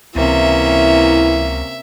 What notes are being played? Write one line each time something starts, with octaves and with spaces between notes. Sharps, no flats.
C#2 C3 E3 A#3 C#4 E4 E5